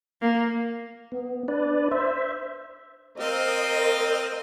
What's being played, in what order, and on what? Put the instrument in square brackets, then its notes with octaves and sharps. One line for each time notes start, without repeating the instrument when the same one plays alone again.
[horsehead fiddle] A#3
[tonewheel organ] B3
D4 B4 D5
C5 E5
[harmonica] C4 F5 [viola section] A#4 C5 D#5